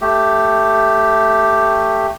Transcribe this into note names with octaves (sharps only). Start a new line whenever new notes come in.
A3 G4